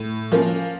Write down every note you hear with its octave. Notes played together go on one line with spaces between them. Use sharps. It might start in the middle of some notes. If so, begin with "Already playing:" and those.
Already playing: A2
F3 A#3 C#4